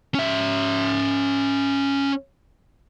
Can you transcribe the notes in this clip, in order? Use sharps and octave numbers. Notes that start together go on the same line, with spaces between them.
C#4 E5